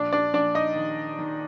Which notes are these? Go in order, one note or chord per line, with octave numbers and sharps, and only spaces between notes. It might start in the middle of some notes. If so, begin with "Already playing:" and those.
Already playing: A#1 D4 D5
D4 D5
A#1 D4 D5
D#4 D#5
D#3
D#3